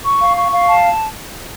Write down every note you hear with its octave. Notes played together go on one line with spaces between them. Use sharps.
C#6
F5
C#6
F5
A5